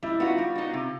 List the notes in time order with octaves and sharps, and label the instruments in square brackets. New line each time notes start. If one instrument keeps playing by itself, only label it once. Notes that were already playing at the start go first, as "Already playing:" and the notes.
[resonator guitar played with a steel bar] G3 [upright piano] E4
[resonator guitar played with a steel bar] B3 D#4 F#4 [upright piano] F4
[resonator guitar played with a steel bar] G3
B3 D#4 F#4
C3